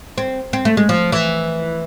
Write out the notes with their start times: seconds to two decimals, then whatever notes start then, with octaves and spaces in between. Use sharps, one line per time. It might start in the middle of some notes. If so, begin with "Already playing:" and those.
0.18 C4
0.53 C4
0.65 A3
0.77 G#3
0.89 F3
1.12 E3